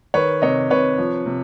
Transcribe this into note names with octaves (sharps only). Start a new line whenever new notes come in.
D#3 B4 C#5
C3 C#5 D#5
C3 B4 C#5
F3
C3